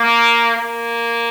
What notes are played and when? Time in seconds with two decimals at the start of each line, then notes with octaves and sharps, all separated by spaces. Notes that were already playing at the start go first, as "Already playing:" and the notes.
Already playing: A#3
0.55 A#3